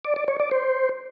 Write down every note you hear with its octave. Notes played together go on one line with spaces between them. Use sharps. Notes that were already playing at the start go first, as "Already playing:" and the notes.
D5
D5
C#5
D5
C5